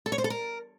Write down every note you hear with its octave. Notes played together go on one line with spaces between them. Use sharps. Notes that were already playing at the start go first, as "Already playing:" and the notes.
A4
C#5
C5
A4
A#4